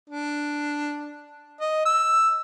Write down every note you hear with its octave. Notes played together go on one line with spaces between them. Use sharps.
D4
D#5
E6